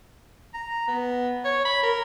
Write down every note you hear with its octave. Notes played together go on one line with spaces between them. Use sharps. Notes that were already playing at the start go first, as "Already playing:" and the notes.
A#5
B3
C#5
B5
A#4